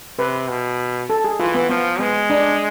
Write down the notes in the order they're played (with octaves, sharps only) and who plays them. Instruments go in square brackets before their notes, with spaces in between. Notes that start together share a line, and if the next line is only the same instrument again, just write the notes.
[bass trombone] C3 [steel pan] B4
[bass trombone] B2
[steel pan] A4
G#4
[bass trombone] E3 [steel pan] F4
[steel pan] B3
[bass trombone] F3 [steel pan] B3
[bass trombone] G#3 [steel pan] B3
[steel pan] D4